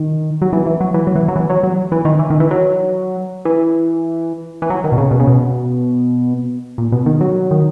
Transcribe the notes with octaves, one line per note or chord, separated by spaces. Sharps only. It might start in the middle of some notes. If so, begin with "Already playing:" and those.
Already playing: D#3
F#3
E3
E3
F#3
E3
F#3
E3
F#3
E3
F#3
F#3
E3
D#3
E3
D#3
E3
F#3
E3
E3
F#3
D#3
B2
C#3
B2
C#3
B2
A#2
B2
D#3
F#3
D#3